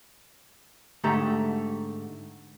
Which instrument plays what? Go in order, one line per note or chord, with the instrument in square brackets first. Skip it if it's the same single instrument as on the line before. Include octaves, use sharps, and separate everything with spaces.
[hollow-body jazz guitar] G#2 D3 A3 G4 A#5